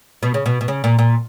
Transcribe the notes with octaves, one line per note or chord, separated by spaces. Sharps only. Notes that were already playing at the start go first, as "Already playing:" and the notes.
B2
C#3
B2
B2
C#3
A#2
A#2